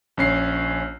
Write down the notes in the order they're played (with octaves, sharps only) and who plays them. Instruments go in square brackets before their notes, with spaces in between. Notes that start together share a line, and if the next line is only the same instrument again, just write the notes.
[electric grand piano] A#1 C#4 C7